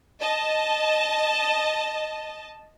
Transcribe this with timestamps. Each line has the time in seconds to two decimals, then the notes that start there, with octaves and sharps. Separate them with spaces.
0.21 D#5 A5